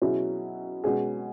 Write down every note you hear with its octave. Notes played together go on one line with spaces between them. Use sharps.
B2 F#3 C#4 E4 G#4
B2 G#3 C#4 G#4